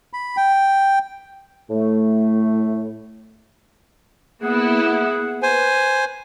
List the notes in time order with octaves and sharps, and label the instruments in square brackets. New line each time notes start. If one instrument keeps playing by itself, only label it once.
[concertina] B5
G5
[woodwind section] A2 A3
[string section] A#3 B3 E4 [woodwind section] G#4 F#5
[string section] B4 [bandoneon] C5 G#5